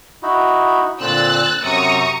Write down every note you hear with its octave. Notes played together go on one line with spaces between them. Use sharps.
D#4 E4 F#4
A#2 D3 C4 E6 F#6 A6
F#2 C3 A#5 C#6 D#6 E6